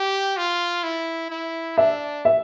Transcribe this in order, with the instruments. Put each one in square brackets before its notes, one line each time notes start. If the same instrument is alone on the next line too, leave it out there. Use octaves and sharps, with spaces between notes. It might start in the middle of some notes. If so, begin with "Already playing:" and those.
Already playing: [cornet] G4
F4
E4
E4
[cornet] D4 [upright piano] E5
[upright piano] E5